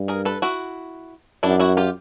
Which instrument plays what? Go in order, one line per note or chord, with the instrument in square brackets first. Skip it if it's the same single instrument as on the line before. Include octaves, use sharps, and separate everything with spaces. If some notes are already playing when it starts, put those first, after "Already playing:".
Already playing: [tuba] G2
[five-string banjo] G#4 A#4
A4 B4
E4 F#4
[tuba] F#2 [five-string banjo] D4 E4
[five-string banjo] E4 F#4
F4 G4